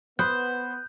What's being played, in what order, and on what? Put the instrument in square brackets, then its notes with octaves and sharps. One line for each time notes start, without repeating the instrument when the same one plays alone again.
[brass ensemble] B3 [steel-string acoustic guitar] C5 [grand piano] B5 D#6 F#6 [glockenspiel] G6